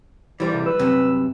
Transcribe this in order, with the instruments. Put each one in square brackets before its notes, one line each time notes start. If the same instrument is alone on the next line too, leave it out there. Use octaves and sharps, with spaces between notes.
[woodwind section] A#2 C5 D5 [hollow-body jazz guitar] E3 G3
[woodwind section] F2 G#2 C3
B4 E6
[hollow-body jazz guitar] C2 F#2 C3